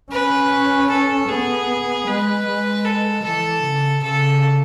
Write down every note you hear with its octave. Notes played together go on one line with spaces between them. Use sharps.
C#4 B4
A4
B3 G#4
G#3 B4
G#3
A4
E3 A4
C#3
C#3 A4